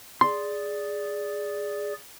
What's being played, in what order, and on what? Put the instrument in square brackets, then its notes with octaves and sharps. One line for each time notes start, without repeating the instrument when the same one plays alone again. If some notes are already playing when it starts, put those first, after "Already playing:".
[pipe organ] G#4 D5 [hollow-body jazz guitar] C6